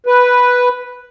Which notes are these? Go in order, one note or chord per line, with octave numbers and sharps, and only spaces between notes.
B4